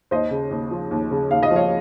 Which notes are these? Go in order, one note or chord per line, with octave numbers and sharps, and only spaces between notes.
D#2 C5 D#5
C#3
D#2
F3
D#2
C#3
D#2 F5
D#5
F3
C#5 F5